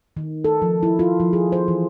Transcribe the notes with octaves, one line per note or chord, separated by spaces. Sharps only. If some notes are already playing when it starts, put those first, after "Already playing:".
D#3
A4
F3
E4
F4
F3
G#4
C5
E3